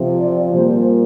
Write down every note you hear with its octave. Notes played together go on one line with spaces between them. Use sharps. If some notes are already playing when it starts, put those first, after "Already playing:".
Already playing: C3 F3
D5
A#2 G3 C5